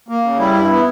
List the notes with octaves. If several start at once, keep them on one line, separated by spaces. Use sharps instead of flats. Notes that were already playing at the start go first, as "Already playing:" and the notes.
A#3
C#3
G3 E4
G2
B3